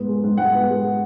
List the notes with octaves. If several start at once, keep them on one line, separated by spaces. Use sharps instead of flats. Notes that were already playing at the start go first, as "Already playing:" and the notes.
Already playing: G#2 B3
G#3
G#2
G#2 F#5
B3
G#3